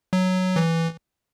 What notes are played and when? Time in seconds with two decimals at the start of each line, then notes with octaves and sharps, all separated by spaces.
0.13 F#3
0.56 E3